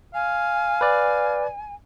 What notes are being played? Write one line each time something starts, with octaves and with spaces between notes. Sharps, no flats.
F5 G#5
B4 D5